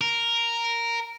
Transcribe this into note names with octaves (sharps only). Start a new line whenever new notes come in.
A#4